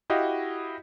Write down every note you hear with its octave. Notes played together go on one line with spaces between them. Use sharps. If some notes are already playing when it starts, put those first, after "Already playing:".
E4 F#4 G4 D#5 F5